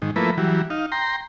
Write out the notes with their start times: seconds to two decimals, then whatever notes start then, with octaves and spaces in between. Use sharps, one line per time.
0.02 G#2 D#3
0.16 F3 A3 A#3 E4 B4
0.38 E3 F#3 G3
0.70 D#4 F5
0.92 G5 A#5 C6